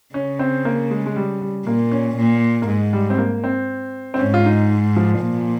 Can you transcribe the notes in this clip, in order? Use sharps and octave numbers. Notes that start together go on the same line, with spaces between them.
C#3 C#4
C4
A#3
G#3
G#3
G3
G3
A#2 A#3
C#4
A#2
A#3
G#2 G#3
G3
C4
A#3
C4
C4
G#2 C#4
F4
D#4
F3
A#2